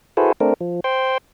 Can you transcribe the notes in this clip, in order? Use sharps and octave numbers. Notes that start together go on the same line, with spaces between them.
E4 F#4 G#4 A4 B4 C5
A3 C4 D4 A#4
F3
C5 G5 C6